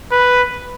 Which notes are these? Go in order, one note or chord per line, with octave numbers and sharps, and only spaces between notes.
B4